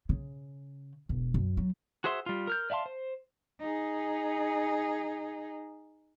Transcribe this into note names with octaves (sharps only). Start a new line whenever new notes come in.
C#3
E1
F#2
F#3
F#4 G#4 C5 E5 C6
G3 F4
A#4 F6 G6
D5 E5 F5 A5 C6
C5
D#4 G#4